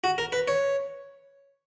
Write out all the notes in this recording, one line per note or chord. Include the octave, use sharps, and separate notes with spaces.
F#4
A#4
B4
C#5